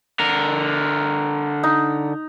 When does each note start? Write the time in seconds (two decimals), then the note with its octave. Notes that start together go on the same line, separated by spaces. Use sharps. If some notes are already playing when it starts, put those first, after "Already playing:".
0.20 D3 A#4
1.64 D#4